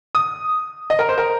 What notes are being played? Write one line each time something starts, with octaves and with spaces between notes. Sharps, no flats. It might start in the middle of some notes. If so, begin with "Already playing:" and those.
D#6
D#5
A#4
C5
A#4